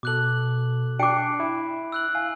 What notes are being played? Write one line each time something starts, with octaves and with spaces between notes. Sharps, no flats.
B2 A4 D6 F#6 F#7
D4 G5 D6 F#6 C7 D7
E4
E6 F#6 F#7
F5 G#5